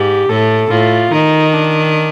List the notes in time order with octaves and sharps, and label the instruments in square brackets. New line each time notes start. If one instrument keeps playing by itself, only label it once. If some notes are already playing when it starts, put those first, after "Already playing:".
Already playing: [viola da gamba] G#2 [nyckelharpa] G4
[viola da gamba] A2 [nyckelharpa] A4
[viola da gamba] A2 [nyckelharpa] F4
[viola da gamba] D#3 [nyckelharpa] D#4
[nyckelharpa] D4